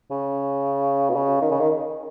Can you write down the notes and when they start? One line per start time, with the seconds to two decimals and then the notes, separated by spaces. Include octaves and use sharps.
0.10 C#3
1.10 B2
1.15 C#3
1.41 D#3
1.51 C#3
1.60 D#3